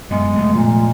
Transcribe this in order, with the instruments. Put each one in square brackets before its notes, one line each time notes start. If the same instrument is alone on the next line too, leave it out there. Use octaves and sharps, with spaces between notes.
[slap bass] F#2 B3 [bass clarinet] G#3
[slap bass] F1 A3
[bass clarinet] A#2